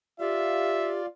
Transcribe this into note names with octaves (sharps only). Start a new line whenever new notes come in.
F4 G4 D5 E5 F5